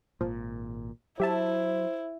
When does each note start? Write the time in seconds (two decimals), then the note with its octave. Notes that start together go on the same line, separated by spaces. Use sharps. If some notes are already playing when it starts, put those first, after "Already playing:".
0.21 G#1 A#2 F3
1.20 F#3 E4 G4 C5 E5 A5